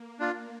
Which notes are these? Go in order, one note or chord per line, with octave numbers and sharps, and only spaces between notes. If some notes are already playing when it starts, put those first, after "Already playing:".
Already playing: A#3
D4 F4